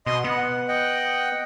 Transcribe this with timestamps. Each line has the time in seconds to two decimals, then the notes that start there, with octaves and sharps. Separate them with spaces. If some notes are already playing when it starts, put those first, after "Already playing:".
0.06 B2 D#5 C6 D#6
0.24 B3 F#5
0.68 D#5 F#5 G5